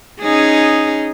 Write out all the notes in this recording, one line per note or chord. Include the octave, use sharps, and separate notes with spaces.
C#4 D#4 G#4